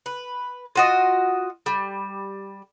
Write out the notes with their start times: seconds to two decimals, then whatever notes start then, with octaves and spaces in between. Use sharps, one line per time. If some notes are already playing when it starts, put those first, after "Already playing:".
0.06 B4
0.76 F4 F#4 D#5
1.66 G3